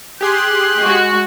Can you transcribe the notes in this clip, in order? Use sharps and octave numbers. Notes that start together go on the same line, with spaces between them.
G4 G#4 C6 F#6
G#3 F#4